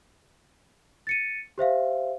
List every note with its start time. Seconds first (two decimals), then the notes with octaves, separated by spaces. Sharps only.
1.07 A6 C#7 D#7
1.58 G4 C5 E5 F5